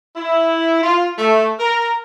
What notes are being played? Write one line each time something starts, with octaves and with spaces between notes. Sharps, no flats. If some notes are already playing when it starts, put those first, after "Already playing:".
E4
F4
A3
A#4